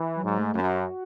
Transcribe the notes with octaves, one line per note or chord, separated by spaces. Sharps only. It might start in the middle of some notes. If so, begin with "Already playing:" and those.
Already playing: E3
F#3
G#2
A3
F#2
F#4